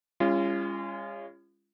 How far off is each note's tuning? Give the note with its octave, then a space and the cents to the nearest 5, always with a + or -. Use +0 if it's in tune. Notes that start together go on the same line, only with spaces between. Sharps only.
G#3 -45 C#4 +0 F4 -30